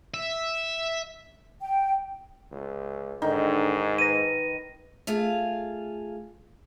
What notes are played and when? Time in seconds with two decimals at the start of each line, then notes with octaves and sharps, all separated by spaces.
0.14 E5
1.61 G5
2.52 C#2
3.22 G#2 D3 D#3
3.99 B4 A#6 D#7
5.07 A3 F4 G#4 F5